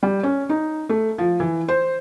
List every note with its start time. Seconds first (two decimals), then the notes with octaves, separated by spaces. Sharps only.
0.03 G3
0.23 C#4
0.49 D#4
0.89 A3
1.18 F3
1.40 E3
1.68 C5